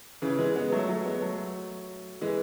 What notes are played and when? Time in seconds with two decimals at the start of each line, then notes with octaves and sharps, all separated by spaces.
0.22 C#3 E3
0.38 E3 G#3
0.55 G#3 B3
0.72 F#3 A3
0.88 F#3 A3
1.05 G#3 B3
1.21 F#3 A3
2.21 E3 G#3